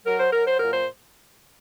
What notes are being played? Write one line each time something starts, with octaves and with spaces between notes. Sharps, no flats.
F#3 A#4
C5
F#3 A#4
C5
A#2 A#4
C5